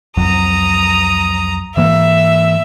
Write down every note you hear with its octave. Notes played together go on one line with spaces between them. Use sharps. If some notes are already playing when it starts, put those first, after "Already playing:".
C2 F2 F#3 A#5 D#6
G#2 E3 A#3 E5